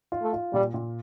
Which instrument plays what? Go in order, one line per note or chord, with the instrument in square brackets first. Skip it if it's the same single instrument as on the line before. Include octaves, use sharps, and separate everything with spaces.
[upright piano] F4
[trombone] A3
[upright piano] F4
[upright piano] A#2 [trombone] G3
[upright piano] A#2